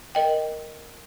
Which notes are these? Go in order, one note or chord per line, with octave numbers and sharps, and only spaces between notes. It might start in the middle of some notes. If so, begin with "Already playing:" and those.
A#4 D#5 G5